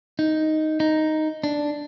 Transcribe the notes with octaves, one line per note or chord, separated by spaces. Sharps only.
D#4
D#4
D4